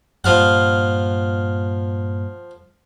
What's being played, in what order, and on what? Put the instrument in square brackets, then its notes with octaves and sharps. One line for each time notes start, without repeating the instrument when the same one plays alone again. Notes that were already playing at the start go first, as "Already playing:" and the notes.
[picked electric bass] G2 A#2 [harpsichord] F3 F5 F#5